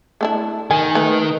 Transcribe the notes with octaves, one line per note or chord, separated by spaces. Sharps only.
A3 D4 E4
D#3 G#5
A3 B4